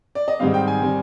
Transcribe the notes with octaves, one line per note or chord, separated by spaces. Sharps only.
D5
D#5
G#2 D#3 G3 C4 F5
G5
G#5
D#3 G3 C4